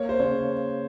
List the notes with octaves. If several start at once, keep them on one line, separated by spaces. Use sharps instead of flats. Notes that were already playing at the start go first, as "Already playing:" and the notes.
Already playing: A#3 C#5
C5
C#3 C#5